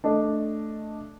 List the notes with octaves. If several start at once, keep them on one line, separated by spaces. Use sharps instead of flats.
A3 D4 A4 D#5